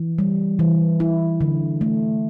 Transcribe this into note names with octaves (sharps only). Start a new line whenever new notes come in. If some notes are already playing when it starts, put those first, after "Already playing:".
Already playing: E3
G3
E3
E4
D3
A3